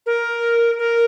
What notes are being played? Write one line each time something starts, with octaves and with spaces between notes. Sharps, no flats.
A#4
A#4